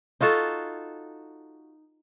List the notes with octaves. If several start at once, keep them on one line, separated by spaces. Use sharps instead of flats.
D#4 F4 F#4 A4